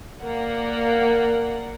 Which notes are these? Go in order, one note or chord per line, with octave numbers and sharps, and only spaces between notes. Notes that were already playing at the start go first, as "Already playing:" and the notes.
A#3 D5 F#5